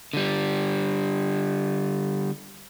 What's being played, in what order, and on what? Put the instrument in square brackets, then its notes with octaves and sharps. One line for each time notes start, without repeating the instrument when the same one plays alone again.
[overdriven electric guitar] D3 G3